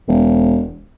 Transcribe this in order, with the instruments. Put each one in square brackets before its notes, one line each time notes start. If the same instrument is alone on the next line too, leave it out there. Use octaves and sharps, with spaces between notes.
[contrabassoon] E1